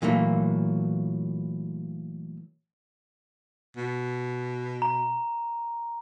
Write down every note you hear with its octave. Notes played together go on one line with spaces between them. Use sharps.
A#2 E3 F#3 A3 A#3
B2
A#5